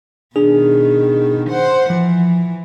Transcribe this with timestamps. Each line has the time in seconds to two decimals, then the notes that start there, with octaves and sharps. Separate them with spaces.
0.36 B2 D#3 D4 G#4
1.50 C5 F#5
1.90 E3 F3